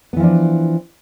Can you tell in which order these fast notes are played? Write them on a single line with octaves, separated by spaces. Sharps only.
B3 E3 F3 D4